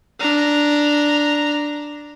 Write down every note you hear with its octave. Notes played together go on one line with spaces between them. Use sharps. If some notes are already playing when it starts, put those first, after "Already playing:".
D4 A#5